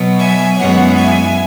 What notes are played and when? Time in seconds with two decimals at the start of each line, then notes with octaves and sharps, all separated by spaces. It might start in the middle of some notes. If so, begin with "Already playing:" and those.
Already playing: B2 F#3 B3
0.18 E5 G#5
0.58 F#2 E3 G#3 B3 C#5 F#5
0.97 E5 G#5